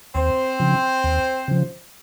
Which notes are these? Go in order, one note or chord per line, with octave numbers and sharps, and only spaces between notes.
D#2 C4 C5
C#3 F3
D#2
C#3 F3